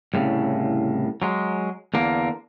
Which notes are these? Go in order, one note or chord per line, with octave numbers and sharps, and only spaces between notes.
C2 A2 C#3
F#3 G#3
E2 D3 A#3